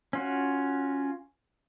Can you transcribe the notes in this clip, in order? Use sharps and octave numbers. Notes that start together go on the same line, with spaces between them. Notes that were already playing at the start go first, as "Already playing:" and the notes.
C#4 F4 F#4